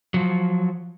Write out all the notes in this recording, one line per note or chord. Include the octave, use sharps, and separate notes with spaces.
F3 F#3